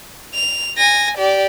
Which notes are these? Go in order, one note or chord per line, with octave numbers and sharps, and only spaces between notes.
F7
G#5 A#6
G4 D5